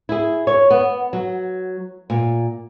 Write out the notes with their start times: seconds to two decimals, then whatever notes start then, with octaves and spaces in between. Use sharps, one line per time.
0.09 E4 G#4
0.47 C#5
0.70 B3
1.13 F#3
2.10 A#2